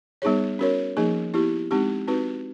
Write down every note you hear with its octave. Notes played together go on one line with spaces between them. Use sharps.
G3 B3 D#4 G#4 C#5
C#4 F#4 A#4 C#5
F3 A#3 D#4 G#4
B3 E4 G4
G#3 C4 D#4 G4
C4 D#4 F#4 B4